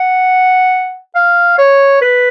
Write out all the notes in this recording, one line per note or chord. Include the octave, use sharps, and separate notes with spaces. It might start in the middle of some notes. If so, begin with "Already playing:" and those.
Already playing: F#5
F5
C#5
B4